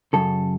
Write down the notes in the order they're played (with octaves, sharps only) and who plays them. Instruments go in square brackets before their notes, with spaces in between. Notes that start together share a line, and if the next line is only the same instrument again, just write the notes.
[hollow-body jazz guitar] F#2 C#3 A4